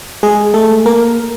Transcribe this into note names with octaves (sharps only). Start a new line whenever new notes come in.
G#3 G#4
A3 A4
A#3 A#4